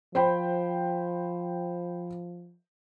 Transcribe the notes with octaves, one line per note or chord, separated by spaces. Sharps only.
F3 C5 G5 B5